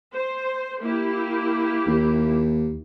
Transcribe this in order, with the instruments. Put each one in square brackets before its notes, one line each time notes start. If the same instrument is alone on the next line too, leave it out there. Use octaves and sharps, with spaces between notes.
[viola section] C5
A#3 E4 G4
[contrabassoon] D#2